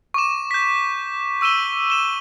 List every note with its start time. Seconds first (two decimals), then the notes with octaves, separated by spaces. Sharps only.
0.14 C#6 D6 E7
0.51 G6 B6
1.41 C#6 E6 D#7 E7 G7
1.90 D#7 E7 G7